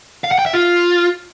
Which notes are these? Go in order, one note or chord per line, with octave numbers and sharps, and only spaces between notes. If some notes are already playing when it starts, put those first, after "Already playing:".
F5
F#5
G5
E5
F4